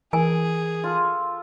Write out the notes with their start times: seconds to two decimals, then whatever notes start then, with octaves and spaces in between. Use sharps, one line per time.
0.13 E3 G#4 A#4 G#5
0.84 F4 A4